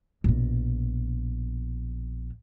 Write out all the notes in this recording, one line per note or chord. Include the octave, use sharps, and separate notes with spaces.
A#1 B2